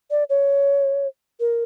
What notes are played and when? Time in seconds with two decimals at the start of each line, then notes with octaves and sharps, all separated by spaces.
0.11 D5
0.30 C#5
1.40 A#4